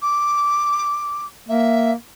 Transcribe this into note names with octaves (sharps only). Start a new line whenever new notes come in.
D6
A#3 E5